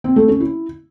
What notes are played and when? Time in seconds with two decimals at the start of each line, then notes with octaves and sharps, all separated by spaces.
0.04 C4
0.16 A3
0.28 C#4
0.40 E4